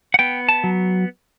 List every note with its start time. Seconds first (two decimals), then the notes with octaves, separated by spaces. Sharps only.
0.14 F#5
0.19 B3 G5
0.49 A5
0.64 F#3